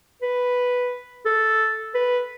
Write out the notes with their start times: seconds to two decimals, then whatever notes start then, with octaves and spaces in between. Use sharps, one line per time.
0.22 B4
1.25 A4
1.95 B4